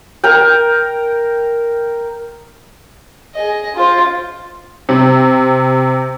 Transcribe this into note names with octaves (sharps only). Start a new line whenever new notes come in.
A#4 G5
G#4 D#5
F4 C5
C3